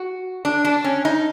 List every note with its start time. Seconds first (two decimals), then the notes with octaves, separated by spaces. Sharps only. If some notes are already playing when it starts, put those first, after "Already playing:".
Already playing: F#4
0.45 D4
0.65 D4
0.84 C#4
1.05 D#4